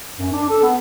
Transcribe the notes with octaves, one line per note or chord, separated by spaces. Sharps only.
F#2
D4
A4
B3